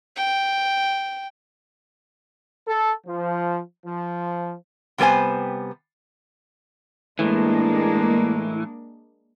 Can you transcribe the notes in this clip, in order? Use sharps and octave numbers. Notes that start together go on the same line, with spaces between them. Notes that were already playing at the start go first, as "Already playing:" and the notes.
G5
A4
F3
F3
C3 G3 B3 C5 G#5
A2 E3 G#3 A#3 D4